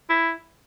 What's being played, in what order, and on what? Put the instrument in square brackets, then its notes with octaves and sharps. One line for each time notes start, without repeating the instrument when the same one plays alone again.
[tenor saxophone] E4